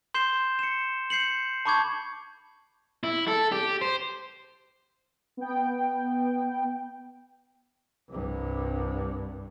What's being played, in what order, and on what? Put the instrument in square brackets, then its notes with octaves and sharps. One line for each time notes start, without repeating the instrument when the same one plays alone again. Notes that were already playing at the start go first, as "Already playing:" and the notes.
[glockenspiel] C6 G6 C7 E7 G7
C#7 E7
G6 C7 C#7 F#7
A5 B5 C#6 D6 G6 G#6
[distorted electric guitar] E4
A4
G4
C5
[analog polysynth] B3 G5
[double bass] C2 G2